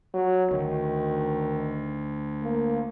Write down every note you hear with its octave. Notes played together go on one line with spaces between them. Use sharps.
F#3
D2 D#3
A#3